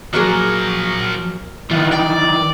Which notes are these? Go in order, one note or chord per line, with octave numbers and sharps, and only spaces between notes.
F3 F#3 A#3 G#4 A#4
D#3 E3 F4 F#5
D5 G5